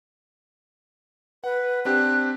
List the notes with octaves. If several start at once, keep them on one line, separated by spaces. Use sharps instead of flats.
B4 F#5
C4 D4 G4 F#6